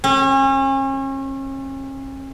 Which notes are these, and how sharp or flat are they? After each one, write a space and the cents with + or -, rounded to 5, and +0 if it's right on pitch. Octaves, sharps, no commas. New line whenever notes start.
C#4 -40